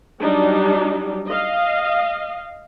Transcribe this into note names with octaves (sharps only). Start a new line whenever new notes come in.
F#3 G3 D4 D#4
D#5 F5